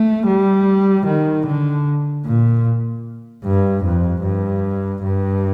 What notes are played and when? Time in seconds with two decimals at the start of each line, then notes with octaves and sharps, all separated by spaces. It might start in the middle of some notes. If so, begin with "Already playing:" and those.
Already playing: A3
0.27 G3
1.06 D#3
1.46 D3
2.25 A#2
3.44 G2
3.84 F2
4.24 G2
5.03 G2